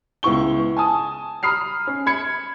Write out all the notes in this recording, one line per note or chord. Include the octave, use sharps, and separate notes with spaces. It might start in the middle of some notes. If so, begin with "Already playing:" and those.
C#2 B3 E4 C#6 G7
G#5 A5 D#6
A#5 B5 D#6 F6 C7
C#4
B5 G#6 C#7